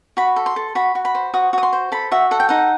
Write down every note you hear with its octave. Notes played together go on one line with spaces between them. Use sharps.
F#4 B5
A4
C6
A4
F#4 B5
F#4
B5
C5
F#4 D#6
F#4 D#6
C6
C5
A4 B5
F#4 E5
A4 F#5
G5
D#4 F#5